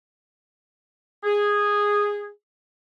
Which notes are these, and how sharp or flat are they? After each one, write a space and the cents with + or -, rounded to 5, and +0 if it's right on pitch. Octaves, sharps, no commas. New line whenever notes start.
G#4 -10